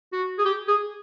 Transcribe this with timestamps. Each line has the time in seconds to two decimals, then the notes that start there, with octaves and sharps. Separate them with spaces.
0.12 F#4
0.38 G#4
0.45 G4
0.67 G#4